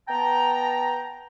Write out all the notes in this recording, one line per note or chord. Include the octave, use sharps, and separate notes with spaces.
B3 G5 A5 A#5